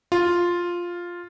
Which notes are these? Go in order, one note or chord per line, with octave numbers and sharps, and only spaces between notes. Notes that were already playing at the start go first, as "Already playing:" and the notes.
F4